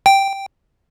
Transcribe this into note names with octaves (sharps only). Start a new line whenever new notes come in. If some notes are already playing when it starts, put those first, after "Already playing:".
G5